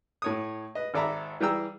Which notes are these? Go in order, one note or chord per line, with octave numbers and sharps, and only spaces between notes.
A2 C#5 D#6
B4 D#5
G#1 A4 D5 E5 A#5 B5
E3 G3 G#4 G5 A#5 E6